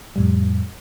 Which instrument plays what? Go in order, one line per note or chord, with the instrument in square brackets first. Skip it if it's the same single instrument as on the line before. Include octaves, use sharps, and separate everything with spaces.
[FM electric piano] F2 A2 G3